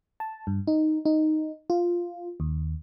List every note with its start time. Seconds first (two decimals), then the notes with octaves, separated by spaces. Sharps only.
0.20 A5
0.47 G2
0.67 D#4
1.05 D#4
1.70 F4
2.40 D#2